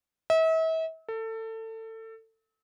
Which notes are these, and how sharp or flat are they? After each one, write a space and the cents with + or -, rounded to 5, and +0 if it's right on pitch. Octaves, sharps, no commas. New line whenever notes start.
E5 -40
A4 +25